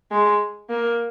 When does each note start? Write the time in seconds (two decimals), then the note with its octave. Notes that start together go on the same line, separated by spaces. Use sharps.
0.11 G#3
0.70 A#3